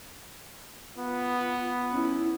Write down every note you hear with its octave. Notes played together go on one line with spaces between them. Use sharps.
B3 F4
C#4 E4